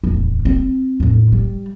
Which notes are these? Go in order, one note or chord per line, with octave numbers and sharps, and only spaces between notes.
D1 E2
C4
E2 A2
G3